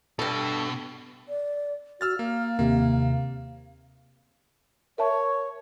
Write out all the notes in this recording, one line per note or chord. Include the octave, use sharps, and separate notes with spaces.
G2 B2 A4
D5
F#4 E6 F6 A6
A#3 F5
D#2 C3 A#3
A#4 C#5 E5 A5